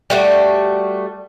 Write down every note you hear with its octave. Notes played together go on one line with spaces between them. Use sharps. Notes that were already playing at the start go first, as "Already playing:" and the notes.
G3 A3 F#4